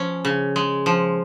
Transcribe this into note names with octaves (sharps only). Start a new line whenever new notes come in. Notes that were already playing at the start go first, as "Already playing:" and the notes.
Already playing: F3 C#4
C#3
G#3
F3